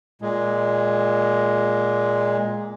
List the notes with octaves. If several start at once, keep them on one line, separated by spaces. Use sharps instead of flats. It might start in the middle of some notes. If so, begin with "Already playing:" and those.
A#2 G#3